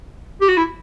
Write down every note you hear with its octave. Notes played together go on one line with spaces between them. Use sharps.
G4
F#4
E4